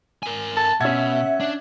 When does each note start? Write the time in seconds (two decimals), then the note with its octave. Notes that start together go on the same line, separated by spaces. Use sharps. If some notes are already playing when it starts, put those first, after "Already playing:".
0.23 A#4 G#5
0.57 A5
0.81 B2 C#4 E5 F#5 G#6
1.40 D4